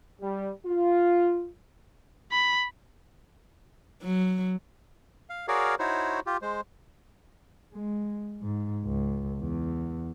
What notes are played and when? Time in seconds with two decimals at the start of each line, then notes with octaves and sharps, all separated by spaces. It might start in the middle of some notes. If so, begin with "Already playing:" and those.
0.21 G3
0.67 F4
2.32 B5
4.03 F#3
5.30 F5
5.48 F#4 G#4 A#4 C#5 D5 F5
5.79 D#4 E4 F#4 C5 C#5
6.27 F4 G4
6.42 G#3 C5
7.74 G#3
8.42 G#2
8.85 C#2
9.40 E2